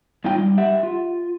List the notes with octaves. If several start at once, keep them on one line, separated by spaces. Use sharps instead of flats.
G2 F#3 D#4 F4 G5
G3
G4 E5 F#5
F4